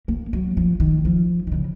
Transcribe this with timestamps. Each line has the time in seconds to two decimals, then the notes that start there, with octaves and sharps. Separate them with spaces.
0.08 A#3
0.33 F#3
0.57 F3
0.80 D#3
1.05 F3
1.47 D#3
1.52 C#3